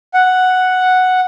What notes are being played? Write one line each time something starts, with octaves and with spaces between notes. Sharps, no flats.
F#5